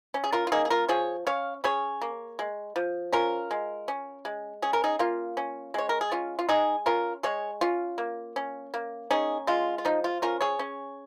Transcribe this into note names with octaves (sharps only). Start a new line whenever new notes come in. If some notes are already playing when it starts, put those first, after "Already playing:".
C#4
G#4
F4 A#4
F4
A#3 D#4 G#4
G#4
F4 A#4
F3 G#4 C#5
C#4 C#5 F5
C#4 G#4 C#5
A#3
G#3
F3
C#4 F4 A#4
G#3
C#4
G#3
C#4 G#4
A#4
D#4 G#4
A#3 F4
C#4
G#3 C#5
A#4
G#4
C#4 F4
F4
G#3 D#4 G#4
C#4 F4 A#4
G#3 G#4 C#5
C#4 F4
A#3
C#4
A#3
C#4 D#4 G#4
G#3 F4
F4
F3 D#4
F4
C#4 F4 A#4
G#4 C#5
C#4